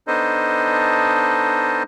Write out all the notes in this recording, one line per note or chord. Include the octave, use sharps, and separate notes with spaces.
B3 D4 D#4 A4 C5 D#5